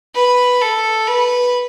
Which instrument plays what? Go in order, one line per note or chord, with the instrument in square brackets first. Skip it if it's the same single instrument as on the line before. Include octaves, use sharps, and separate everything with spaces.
[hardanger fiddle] B4
A4
B4